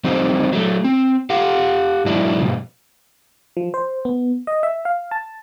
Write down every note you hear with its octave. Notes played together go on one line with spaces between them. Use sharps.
F3 G3 C4 D#4 C5
F#3 A3
C4
G4 F5 F#5
G#2 F#3 D4 E4
G2 B2 F3
F3
C5
B3
D#5
E5
F5
A5